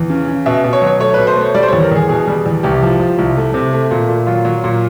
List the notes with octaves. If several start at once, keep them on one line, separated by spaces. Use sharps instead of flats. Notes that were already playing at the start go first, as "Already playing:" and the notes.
Already playing: E2
C#3
C#3
B2 E5
B2
C#5
F#3
C#5
A3 C#5
B2 B4
C5
A3 C#5
G3 D5
C5
E2 C#5
A#4
E2 G#4
B2 G#4
G3
E2
C2 G4
F3
F3
C2
A3
C3
A3
A#2
A#2
F#3 F4
F#3
A#2